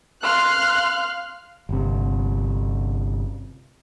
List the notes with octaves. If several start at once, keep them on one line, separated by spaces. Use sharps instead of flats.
F5 C6 F6 F#6
G1 C3